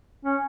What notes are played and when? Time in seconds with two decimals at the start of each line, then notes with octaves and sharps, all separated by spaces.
0.25 C#4